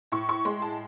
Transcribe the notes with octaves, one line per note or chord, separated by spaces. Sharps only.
A2 C#6
C#6
G#3 C6
A5